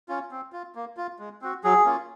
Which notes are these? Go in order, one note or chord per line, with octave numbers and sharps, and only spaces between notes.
C#4 F4
C4
F4
A#3
F4
G#3
C4 F#4
F#3 G#4
A#3 C#4 F4